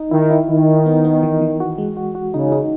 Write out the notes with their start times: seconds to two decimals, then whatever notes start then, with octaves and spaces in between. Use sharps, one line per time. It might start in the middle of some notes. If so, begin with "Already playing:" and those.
Already playing: D#4
0.11 D#3 E4
0.30 E4
0.49 D#3 E4
0.68 E4
0.86 B3
1.05 B3
1.23 E3
1.41 E3
1.60 F#4
1.78 G#3
1.97 F#4
2.15 F#4
2.34 C#3 D#4
2.52 D#4